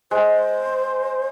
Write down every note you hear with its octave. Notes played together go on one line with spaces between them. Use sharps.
G#3 C5